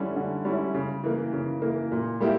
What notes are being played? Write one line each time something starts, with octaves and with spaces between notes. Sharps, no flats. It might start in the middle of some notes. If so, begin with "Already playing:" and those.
Already playing: D3 G3 C#4 E4
D3
G3 C#4 E4
C#3
E3 A#3
C#3
E3 A#3
A#2
G3 A#3 E4 G4